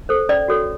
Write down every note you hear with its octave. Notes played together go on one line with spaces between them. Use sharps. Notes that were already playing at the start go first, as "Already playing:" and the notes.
A4 C5
C#4 D5
F#4 A4 C#5